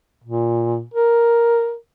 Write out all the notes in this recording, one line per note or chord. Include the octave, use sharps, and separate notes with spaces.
A#2
A#4